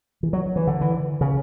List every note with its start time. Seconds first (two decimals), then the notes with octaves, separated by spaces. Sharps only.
0.23 E3
0.33 F#3
0.56 E3
0.67 D3
0.81 E3
1.21 C#3